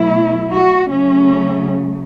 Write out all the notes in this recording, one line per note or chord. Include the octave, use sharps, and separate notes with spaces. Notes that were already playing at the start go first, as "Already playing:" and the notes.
Already playing: B2 F#3 A3 E4
F#4
C#3 F#3 A3 C#4